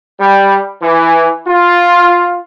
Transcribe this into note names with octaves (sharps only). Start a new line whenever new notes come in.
G3
E3
F4